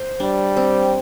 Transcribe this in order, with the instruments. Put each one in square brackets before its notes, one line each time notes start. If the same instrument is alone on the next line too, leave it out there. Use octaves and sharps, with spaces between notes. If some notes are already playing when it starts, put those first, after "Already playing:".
Already playing: [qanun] C5
[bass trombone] G3 [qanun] D4
[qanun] C4